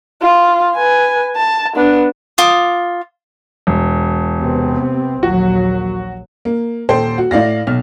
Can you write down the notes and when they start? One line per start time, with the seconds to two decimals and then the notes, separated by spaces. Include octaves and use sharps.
0.21 F4
0.75 B4 G#5
1.36 A5
1.75 B3 D4
2.38 F4 D6 D#6
3.67 E1
4.37 C3 B3 C4
5.23 A#1 D#2 F#3 F#4
6.45 A#3
6.89 D#1 A4 C5 G5
7.18 F#4
7.31 A2 D5 F5 A#6
7.67 B1 F6